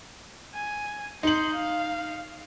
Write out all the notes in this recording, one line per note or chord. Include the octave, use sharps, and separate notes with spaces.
G#5
D#4 C6 G6 F#7
F5